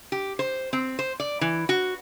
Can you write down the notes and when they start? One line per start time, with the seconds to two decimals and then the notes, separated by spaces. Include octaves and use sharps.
0.12 G4
0.39 C5
0.73 C4
0.99 C5
1.20 D5
1.41 E3
1.69 F#4